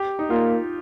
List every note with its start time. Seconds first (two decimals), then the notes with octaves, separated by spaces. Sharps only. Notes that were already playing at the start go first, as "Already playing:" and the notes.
Already playing: G4
0.19 D#4
0.30 A#3 F4